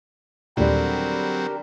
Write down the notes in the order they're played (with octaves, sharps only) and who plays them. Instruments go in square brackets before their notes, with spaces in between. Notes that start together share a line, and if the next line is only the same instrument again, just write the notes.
[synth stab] D#2 A#2 [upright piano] D3 G3 [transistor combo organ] F#3 C4 [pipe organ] G4 A#4